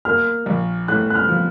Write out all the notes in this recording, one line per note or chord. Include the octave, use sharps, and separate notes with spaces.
A#3 F6
A#1
A2 F#6
F#6
F6
F3